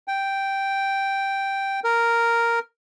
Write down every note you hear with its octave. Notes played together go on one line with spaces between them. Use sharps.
G5
A#4